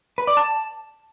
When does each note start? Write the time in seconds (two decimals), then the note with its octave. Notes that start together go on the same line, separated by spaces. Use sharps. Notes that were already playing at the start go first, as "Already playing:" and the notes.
0.18 B4
0.27 D5
0.37 A5